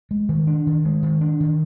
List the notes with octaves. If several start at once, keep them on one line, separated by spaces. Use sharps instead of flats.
G#3
D#3
D4
D#3
G#3
D#3
D4
D#3